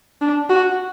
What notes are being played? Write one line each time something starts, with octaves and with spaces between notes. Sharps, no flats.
D4
F#4